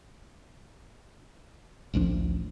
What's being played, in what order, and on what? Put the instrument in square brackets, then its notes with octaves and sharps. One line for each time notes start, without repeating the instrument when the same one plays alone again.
[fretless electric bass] A1 D2 F3 D4